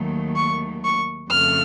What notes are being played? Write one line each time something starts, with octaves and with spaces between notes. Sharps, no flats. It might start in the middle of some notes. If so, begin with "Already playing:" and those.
Already playing: D#2 D#3 F#3 A3
C#6
C#6
F2 C#3 A3 F6